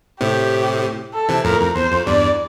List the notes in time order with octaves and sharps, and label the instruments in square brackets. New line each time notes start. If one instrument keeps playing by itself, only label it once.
[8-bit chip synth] A2 C3 [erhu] G4
[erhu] A4
[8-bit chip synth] C3 E3
[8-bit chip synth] F2 A2 [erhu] A#4
[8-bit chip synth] F2
[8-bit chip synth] E2 [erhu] C5
[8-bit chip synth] F2
[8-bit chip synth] E2 G2 [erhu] D5